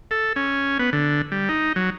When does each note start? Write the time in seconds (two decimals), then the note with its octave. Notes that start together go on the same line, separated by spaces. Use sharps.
0.11 A4
0.36 C#4
0.79 B3
0.93 D3
1.32 G3
1.49 D#4
1.76 F#3